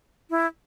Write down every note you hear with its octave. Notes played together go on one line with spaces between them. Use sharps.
E4